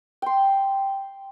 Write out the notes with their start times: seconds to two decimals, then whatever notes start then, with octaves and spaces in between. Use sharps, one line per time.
0.22 G5 C6